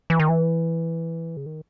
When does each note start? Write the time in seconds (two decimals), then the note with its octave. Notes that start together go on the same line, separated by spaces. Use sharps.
0.10 E3
0.20 D#3
0.29 E3
1.37 C#3
1.46 D#3